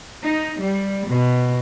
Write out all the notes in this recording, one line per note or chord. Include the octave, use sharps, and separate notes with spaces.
D#4
G3
B2